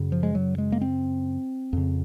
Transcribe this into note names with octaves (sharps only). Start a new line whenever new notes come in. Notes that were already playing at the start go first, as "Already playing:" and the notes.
Already playing: F#2 C#3
F3
G#3
F#3
G#3
A#3
C4
F2 C#3